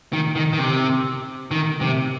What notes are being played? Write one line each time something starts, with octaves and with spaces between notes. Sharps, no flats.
D#3
D#3
D#3
C3
D#3
C3